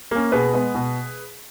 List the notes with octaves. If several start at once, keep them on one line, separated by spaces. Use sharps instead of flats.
A#3 C#4
B2 G#4 B4
G#3 B3
B2